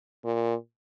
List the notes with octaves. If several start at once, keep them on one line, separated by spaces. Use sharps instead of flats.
A#2